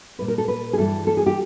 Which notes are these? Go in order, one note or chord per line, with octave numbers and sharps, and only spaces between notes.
A#2 G3 B4
A#4
A4
B4
G#4
G2 E3 G3 A4
A4
G#4
G4